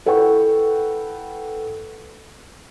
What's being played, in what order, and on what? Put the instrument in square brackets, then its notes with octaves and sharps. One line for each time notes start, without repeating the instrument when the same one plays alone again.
[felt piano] E4 A4 B4 F#5 G5 C#6